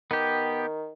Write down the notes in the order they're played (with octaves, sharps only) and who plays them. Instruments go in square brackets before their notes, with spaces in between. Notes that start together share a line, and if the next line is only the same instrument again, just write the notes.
[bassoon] D#3 [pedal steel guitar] B3 G4